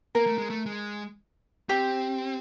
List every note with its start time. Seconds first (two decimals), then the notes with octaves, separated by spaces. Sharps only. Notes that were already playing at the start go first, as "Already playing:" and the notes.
0.15 A#3 A#4
0.26 A3
0.38 G#3
0.50 A3
0.66 G#3
1.69 C4 G4